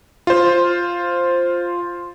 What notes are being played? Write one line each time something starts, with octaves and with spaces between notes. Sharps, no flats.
F4 C5